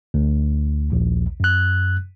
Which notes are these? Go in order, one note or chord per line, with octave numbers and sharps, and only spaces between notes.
D2
A#1 D#2
F#2 F#6